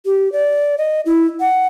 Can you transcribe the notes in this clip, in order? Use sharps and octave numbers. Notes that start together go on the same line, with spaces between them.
G4
D5
D#5
E4
F#5